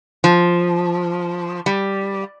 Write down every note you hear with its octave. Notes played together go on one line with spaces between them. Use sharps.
F3
G3